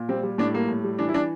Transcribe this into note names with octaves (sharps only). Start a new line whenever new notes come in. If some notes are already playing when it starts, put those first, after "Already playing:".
Already playing: A#2
G3 C4
G3
A2 D4
G3 A#3
A2
G3
E3 D4
E4
E3 D4